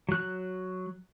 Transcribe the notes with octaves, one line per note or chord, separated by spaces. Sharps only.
F#3 F#6